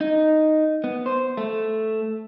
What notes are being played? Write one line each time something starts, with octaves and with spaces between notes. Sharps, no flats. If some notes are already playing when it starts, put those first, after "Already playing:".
D#4
B3
C5
A3